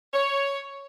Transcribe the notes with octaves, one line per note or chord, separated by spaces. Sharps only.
C#5